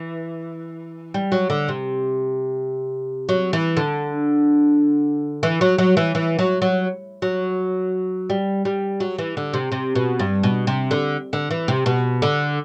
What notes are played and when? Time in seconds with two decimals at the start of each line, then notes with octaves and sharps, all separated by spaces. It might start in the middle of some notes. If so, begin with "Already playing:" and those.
Already playing: E3
1.14 G3
1.32 F#3
1.50 D3
1.68 C3
3.29 F#3
3.53 E3
3.77 D3
5.43 E3
5.61 F#3
5.78 F#3
5.97 E3
6.15 E3
6.39 F#3
6.62 F#3
7.22 F#3
8.30 G3
8.65 G3
9.00 F#3
9.18 E3
9.37 D3
9.54 C3
9.72 C3
9.95 B2
10.19 G2
10.43 B2
10.67 C3
10.91 D3
11.33 D3
11.51 E3
11.68 C3
11.86 B2
12.22 D3